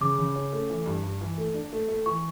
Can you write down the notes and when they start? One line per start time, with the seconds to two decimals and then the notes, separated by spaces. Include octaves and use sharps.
0.01 C#3 D6
0.18 C#3
0.36 C#4
0.53 A3
0.70 E3
0.86 G2
1.04 G2
1.21 E3
1.38 A3
1.54 D4
1.72 A3
1.89 A3
2.06 E3 C#6